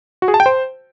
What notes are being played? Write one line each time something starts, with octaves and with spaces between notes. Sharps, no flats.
F#4
G#4
A5
G5
C5